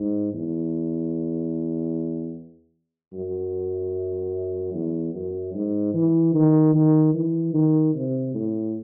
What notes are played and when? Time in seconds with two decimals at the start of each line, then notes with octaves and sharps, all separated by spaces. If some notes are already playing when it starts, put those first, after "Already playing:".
Already playing: G#2
0.33 E2
3.13 F#2
4.74 E2
5.14 F#2
5.54 G#2
5.94 E3
6.34 D#3
6.74 D#3
7.14 E3
7.53 D#3
7.94 C3
8.34 A2